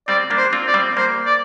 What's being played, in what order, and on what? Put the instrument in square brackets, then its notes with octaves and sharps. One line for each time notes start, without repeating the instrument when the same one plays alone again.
[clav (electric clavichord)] G3 C4 [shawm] D5
[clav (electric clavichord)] A#3 D4
[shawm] C5
[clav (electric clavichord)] C4 F4
[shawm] D5
[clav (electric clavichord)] G3 C4
[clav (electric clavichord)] A#3 [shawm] C5
[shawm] D5